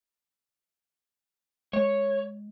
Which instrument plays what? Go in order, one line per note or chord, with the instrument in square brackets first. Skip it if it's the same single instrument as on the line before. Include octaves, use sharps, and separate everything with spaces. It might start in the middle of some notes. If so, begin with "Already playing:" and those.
[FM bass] G#3 [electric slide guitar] C#5